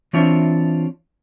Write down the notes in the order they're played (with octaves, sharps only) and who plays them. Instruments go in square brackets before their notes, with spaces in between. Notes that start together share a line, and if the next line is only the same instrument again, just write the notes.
[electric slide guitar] E3 C4 D4 F4 C#5 E5